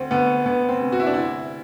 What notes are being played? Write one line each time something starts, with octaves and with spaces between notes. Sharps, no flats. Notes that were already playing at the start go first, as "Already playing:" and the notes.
Already playing: D2 C4
D2 B3
D2 B3
C4
C3
F#4
E4
D4
D2 E4